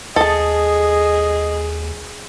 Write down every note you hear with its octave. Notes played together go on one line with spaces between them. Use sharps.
D#2 G#4 A4 D#5 A5